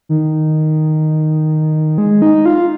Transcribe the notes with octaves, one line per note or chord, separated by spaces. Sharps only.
D#3
G#3
D#4
F4